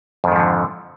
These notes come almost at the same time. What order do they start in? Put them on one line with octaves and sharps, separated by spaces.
F2 D#3 G#2 F3 D3